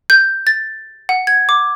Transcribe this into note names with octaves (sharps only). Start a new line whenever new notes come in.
G6
A6
F#5
G#6
D6